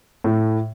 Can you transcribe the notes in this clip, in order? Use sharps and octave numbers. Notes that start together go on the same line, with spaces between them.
A2